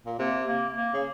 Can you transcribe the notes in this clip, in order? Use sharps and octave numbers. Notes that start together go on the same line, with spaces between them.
A#2
C3 A#3
A#3
A#3
C#3